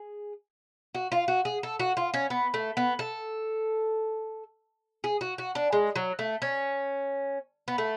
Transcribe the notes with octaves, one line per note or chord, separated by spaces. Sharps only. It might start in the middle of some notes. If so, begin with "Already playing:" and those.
Already playing: G#4
F#4
F4
F#4
G#4
A4
F#4
F4
C#4
B3
A3
B3
A4
G#4
F#4
F#4
D4
G#3
F#3
A3
C#4
B3
A3